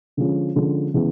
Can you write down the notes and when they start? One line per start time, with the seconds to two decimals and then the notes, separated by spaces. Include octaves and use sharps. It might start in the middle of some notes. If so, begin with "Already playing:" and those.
0.17 D3 F3 G#3 C#4
0.55 D3 F3 G#3 C#4
0.94 C#3 E3 G#3 B3